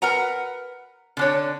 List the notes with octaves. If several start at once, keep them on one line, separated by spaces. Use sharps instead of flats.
A#4 B4 F#5 A#5
D3 D4 C#5